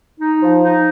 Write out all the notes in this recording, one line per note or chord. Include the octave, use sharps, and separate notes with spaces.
D#4
F3
D#4